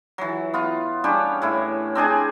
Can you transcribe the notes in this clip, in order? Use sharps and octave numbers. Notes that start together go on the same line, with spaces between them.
E3 F#3
B3 F4
G3 C#4 D4 G4
A2 E4
C4 D4 G#4 G#5